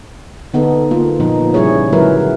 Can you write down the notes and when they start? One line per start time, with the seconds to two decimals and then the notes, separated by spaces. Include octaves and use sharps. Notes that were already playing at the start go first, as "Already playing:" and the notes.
0.54 D3 B3 D#4 A4
0.91 A#3 F4
1.20 A#2 F3 B3 D#4
1.54 C#3 G3 E4 G#4 C#5
1.93 D3 F#3 G#3 E4 A#4 B4